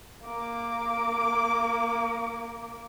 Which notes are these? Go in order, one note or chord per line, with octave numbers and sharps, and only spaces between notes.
A#3 D6